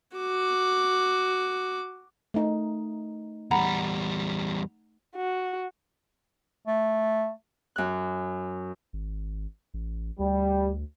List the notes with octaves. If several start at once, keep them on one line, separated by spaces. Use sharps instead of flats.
F#4 D6
A3 D#4
E2 G3 F#5 A#5 B5
F#4
A3
F#2 F#6
G#1
A1
D2 G3